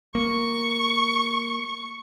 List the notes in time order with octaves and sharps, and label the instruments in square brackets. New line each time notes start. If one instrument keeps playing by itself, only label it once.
[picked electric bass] A#3 [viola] C#6